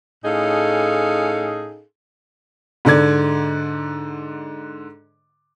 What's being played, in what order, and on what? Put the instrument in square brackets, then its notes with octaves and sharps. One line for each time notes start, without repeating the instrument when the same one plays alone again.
[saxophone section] A2 C#4 D#4 G#4 A4 F5
[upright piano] G#2 D3 D5 G#6